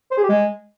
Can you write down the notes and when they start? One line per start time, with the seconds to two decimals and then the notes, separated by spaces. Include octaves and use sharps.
0.11 C5
0.17 G#4
0.23 G4
0.29 G#3